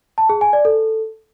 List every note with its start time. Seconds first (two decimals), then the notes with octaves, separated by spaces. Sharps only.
0.18 A5
0.29 G#4
0.41 G#5
0.53 D5
0.65 A4